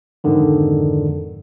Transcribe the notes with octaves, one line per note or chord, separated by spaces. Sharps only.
F2 G#2 D3 D#3